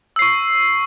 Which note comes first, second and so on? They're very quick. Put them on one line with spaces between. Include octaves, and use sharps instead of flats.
E6 C7 C#6